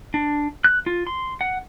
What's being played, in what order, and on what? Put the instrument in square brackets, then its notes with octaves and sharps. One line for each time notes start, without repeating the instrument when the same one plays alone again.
[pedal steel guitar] D4
F#6
F4
C6
F#5